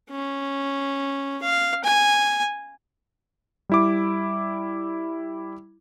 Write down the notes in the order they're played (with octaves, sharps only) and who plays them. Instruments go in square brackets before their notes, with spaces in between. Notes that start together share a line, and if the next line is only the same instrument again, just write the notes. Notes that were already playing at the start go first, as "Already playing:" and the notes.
[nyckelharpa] C#4
F5
G#5
[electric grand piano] G3 E4 D6